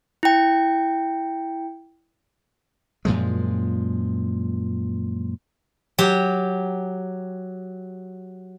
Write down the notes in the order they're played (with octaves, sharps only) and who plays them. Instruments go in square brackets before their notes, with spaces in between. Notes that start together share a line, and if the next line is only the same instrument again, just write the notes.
[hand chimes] E4 G5
[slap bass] F#2 A#2 F3 G#3
[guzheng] F#3 G4